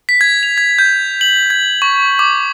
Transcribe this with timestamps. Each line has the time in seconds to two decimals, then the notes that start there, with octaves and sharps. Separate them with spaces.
0.09 B6
0.21 G#6
0.43 F7
0.58 G#6
0.79 G6
1.21 F#7
1.50 G#6
1.82 C#6
2.19 D6